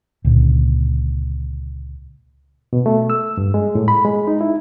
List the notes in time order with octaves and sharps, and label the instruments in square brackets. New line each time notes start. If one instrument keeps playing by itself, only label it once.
[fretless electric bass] C#2 A#2 D3
[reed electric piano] B2
A3
E6
G2
G#3
A2
B5
G#3
D#4
E4